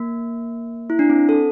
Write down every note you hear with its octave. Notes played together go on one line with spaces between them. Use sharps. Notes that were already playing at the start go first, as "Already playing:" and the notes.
Already playing: A#3
E4
D4
C4
A4